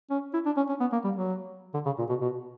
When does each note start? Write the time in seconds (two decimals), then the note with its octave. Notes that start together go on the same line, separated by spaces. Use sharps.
0.10 C#4
0.33 E4
0.46 D4
0.56 C#4
0.69 C#4
0.80 B3
0.92 A#3
1.04 G3
1.16 F#3
1.74 D3
1.85 C#3
1.98 A#2
2.09 B2
2.21 B2